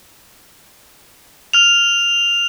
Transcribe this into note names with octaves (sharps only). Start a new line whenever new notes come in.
F6 F7